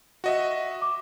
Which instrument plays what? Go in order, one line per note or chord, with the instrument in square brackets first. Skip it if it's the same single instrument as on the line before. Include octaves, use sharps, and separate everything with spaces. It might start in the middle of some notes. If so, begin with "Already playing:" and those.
[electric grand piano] F#4 D#5 E5
[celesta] D6